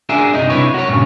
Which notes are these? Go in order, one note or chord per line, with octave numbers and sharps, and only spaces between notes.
D4 F#4 G#4 A#4 E5
G2 C3 D#4 D#5
C3 D4 E4 B4 C#5
F#4 A#4 C#5
G2 A#2 C#3